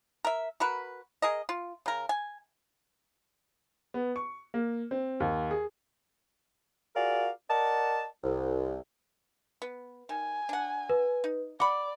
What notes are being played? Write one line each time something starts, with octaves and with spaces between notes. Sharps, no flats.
A#4 E5
F#4 A#4 B4
G#4 A#4 D#5
F4
C#3 A#4
G#5
B3
C#6
A#3
C4
D#2
G#4
F4 F#4 G#4 A#4 D5 F5
A#4 D5 D#5 F#5 A5
C2
B3
D#3 G#5
D4 F#5
B4
D#4
D5 F#5 B5 D6